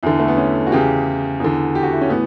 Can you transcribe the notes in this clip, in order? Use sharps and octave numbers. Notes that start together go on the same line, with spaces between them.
E2 D3 E4
A3
B3
C#4
F#4
E2 C#3 E3 G4
E2 D3
G4
F#4
E4
C#4
A2 E3 B3